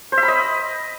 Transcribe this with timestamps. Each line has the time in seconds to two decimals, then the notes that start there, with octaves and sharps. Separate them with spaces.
0.12 C5
0.18 E5
0.23 B5
0.28 D#5